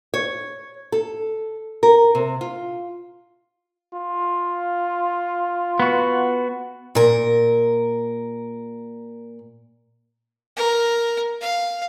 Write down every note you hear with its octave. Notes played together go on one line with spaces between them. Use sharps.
C#5
A4
A#4
C3
F4
F4
B3 F#4
A#2 A#4
A#4
F5